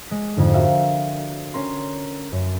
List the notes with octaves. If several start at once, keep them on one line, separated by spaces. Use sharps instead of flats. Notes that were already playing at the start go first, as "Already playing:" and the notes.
G#3 B6
F2 G#2 D3
F#4 A#4 E5 F5 G5
C#4 A#4 C6
F#2